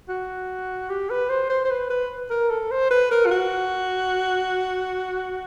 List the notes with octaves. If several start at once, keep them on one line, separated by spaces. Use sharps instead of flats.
F#4
G4
B4
C5
C5
C5
B4
B4
A#4
A4
C5
B4
A#4
F4
F#4